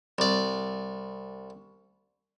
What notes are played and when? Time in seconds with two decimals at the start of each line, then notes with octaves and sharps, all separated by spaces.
0.18 C2 D5